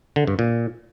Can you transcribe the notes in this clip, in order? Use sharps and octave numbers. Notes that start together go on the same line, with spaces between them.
D3
G2
A#2